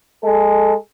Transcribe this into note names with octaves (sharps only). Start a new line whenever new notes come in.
G#3 A4